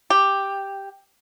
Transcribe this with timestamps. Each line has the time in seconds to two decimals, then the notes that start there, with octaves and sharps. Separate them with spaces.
0.10 G4